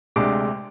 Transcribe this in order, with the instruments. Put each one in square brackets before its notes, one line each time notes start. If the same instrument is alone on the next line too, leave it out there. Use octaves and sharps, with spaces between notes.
[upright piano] D2 C3 G#3 D4 D6